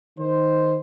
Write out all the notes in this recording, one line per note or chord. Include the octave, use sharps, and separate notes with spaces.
D#3 C5